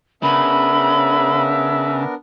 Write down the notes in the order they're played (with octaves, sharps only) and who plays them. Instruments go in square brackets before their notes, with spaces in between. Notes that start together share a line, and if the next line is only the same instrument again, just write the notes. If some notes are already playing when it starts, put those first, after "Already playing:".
[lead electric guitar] C#3 [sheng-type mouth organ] B3 D4 A#4 [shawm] E5 [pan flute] B5